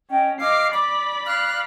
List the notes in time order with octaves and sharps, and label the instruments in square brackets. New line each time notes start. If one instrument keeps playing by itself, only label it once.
[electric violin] C#4 [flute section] D#5 G5
[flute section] D#5 F5 F6 [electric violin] D6 C7
[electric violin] D5 B5 [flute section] D6
[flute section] F5 F6 F#6